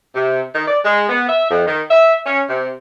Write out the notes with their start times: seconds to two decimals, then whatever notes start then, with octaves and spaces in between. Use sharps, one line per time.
0.15 C3
0.55 D#3
0.67 D5
0.85 G#3
1.09 B3
1.28 E5
1.50 F2
1.66 D#3
1.90 E5
2.25 C#4
2.48 C3